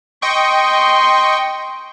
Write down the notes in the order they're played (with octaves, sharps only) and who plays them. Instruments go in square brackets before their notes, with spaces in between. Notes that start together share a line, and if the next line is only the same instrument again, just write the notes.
[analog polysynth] D#5 G5 C#6 [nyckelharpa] C6